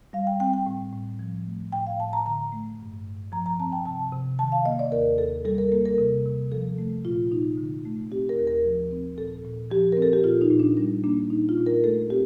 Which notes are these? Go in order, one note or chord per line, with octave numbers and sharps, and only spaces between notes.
G3 F5
G5
C4 G5
G5
A2
A2
F3
A3
A2 G5
F5
A2 A5
A#5
D3 A#5
A3
G2
G2
F3 A#5
A#5
C4 A5
G5
C3 A5
C3
D#3 A5
F5
A#3 D#5
D5
D#2 A#4
D#2 A4
G3 A4
A#4
A#3 A4
A#4
C3
C3
F3 A4
A3
A#2 F4
A#2 D#4
D3
A3
C4 G4
A#4
D#2
A#4
F3
C4
A#2 A4
A#2
F3 G4
C4 A#4
A4
G4
A#2 F4
D#4
A#2
D4
G3 D4
A#3 D4
A#2 D#4
F4
A#2
A#4
A3 A4
C4 G4